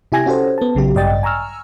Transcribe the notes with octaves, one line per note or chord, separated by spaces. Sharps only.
C3 E4 G4 G#5 G#6 A#6
C#4 F#4 G4 A4 C5
B3 A5
A#1 C#3 F#3 G4
A1 G2 D5 D#5 G5 A6
G#5 A#5 C#6 E6 F6